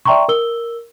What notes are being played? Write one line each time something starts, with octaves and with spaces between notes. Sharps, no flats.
D5 E5 G5 A#5 C6 C#6
A#4 E6 G7